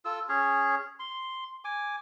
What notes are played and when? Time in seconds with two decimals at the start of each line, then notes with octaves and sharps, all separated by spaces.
0.05 F4 A4 E6
0.29 C#4 G#4 C#5
0.99 C6
1.65 G#5 D6